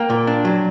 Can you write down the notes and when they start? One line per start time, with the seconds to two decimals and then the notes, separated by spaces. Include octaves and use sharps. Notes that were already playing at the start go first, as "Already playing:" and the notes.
Already playing: A#3 G5
0.10 A#2
0.27 D4
0.45 F#3